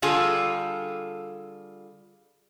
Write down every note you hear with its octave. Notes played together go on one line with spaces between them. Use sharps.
D3 G3 F4 G#4 A4